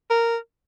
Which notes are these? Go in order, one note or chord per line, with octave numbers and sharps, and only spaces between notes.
A#4